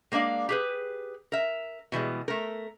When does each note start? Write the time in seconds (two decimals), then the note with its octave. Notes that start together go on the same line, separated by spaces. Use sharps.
0.12 G#3 A#3 D4 D5 F5
0.49 G4 G#4 B4
1.32 A#4 E5
1.92 B2 E3 G3 G#3
2.28 A3 A#4